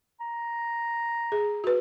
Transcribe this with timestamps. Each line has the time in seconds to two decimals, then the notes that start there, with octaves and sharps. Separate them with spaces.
0.20 A#5
1.32 G#4
1.64 F#4 B4